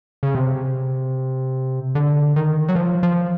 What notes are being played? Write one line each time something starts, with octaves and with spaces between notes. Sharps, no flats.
C#3
C3
D3
D#3
F#3
F3
F3